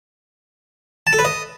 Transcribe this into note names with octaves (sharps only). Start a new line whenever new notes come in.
A5
A4
B4
D#5